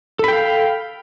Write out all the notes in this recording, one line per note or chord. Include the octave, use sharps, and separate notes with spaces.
A4 F5 G5 B5